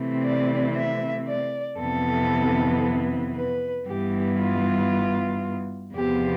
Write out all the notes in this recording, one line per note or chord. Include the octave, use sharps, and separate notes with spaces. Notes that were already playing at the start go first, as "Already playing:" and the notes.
Already playing: C3 E3 A3 C4
D5
E5
D5
F2 C3 E3 B3 A4
B4
G2 E3 B3 G4
F4
E2 C3 F3 B3 G4